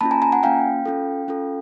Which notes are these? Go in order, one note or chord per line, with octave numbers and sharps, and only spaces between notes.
A#3 C#4 F4 A5 B5
G#5 A#5
G#5 A#5
F#5 G#5
A#3 C#4 F4 F5 G5
C#4 F4 A4
C#4 F4 A4